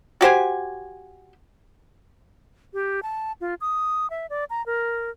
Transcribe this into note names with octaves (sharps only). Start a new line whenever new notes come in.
F#4 G4 C5 G#5
G4
A5
F4
D#6
E5
D5
A#5
A#4